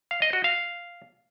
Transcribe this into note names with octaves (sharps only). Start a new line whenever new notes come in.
F5
D#5
F#4
F5